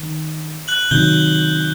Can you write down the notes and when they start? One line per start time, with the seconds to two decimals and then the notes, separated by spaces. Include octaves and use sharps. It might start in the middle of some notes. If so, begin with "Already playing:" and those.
Already playing: D#3
0.68 F#6 F#7
0.91 C3 D#3 F#3 G6 G7